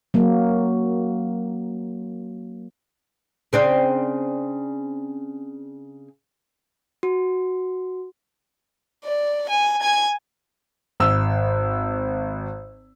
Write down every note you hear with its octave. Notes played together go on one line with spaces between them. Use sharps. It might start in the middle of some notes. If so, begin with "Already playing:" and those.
F#3 A#3
C#3 C4 D4
F#4
D5
G#5
G#5 G#6
G#1 E6